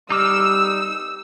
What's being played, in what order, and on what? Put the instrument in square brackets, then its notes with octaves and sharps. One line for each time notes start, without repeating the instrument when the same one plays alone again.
[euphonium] G3 [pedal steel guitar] D#4 D6 F6 [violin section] E6